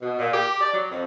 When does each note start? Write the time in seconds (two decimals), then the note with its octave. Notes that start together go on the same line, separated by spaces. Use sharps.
0.02 B2
0.19 A#2
0.34 G4
0.61 D5
0.74 F#3
0.92 F2